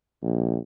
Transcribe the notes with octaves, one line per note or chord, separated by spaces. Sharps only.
A#1